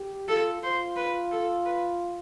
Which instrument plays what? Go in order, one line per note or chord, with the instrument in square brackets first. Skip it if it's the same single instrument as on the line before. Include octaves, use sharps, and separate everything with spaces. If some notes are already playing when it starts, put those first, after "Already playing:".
Already playing: [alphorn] G4
[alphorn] F4 [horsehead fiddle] A4
[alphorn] F4 [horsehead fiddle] C5
[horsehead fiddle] B4
A4
B4